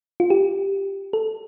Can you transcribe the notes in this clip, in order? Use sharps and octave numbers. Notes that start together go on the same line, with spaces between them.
F4
G4
A4